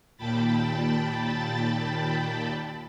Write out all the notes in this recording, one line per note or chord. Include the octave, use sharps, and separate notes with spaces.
D#2 A#2 G5 A5 B5 A6